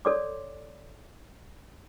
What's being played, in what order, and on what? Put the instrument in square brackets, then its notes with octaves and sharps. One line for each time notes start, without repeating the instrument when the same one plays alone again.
[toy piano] A4 C#5 D5 C6 D6